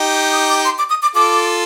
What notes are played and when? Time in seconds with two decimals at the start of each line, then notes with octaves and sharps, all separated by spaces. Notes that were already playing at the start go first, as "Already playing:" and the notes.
Already playing: D#4 G4
0.15 D6
0.32 D#6
0.49 D6
0.65 C6
0.78 D6
0.90 D#6
1.03 D6
1.15 F4 A4 D6